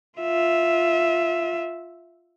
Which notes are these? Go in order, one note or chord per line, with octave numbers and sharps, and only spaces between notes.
F4 E5